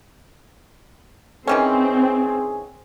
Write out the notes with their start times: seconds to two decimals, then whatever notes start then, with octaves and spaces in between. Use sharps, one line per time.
1.48 D#3 E3 C4 C#4 G#4